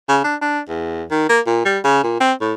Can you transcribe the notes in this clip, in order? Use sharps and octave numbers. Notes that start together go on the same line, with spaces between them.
C#3
D4
D4
E2
D#3
A#3
A#2
G3
C#3
A#2
C4
A2